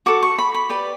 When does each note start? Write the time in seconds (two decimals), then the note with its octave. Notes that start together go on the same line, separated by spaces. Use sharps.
0.06 F#4 A4 D6
0.22 C#6
0.38 B5
0.54 B5
0.69 G4 B4 D5